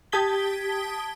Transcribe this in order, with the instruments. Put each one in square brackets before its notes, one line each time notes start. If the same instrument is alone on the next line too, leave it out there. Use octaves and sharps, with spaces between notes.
[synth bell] G4 A5 D#6 G#6 B6 G7